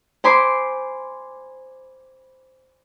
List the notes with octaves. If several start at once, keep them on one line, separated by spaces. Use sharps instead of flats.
C5 G#5 B5 C6 D6